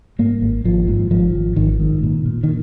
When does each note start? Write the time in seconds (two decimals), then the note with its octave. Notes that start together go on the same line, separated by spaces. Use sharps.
0.19 G#2 A#3
0.42 G#1
0.64 G#1 F3
0.88 G#2
1.11 G#1 F3
1.34 G#1
1.56 G#1 D#3
1.80 G#2
2.03 A#2
2.26 A#2
2.43 D#3